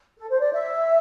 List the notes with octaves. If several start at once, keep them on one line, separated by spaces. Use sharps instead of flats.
A4
C5
D5
E5